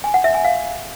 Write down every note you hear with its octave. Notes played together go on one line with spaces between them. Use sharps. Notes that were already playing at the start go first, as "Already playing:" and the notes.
G#5
F#5
E5
G#5
F5